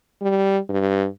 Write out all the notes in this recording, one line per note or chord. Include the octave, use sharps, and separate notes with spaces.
G3
G2